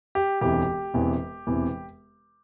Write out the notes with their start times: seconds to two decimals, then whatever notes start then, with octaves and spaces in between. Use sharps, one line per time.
0.15 G4
0.41 E1 D2 C3 E3 G4
0.94 E1 E2 C3 E3
1.47 E1 E2 C3 E3